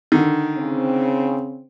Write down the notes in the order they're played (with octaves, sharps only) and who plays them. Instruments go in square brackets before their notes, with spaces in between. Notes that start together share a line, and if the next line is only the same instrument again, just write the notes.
[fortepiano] D3 D#3
[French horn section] C#3 C4